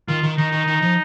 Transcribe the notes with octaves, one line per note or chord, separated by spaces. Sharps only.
D#3 F4
D#3
D#3 D#4
D#3
D#3
F3